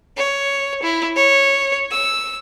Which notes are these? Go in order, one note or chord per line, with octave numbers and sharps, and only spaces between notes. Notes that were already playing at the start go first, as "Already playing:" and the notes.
C#5
E4
C#5
E6